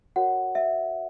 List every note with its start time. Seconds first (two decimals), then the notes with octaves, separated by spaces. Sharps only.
0.16 F#4 A#4 C#5 F#5
0.55 E5